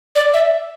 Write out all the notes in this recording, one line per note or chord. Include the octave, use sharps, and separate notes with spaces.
D5
E5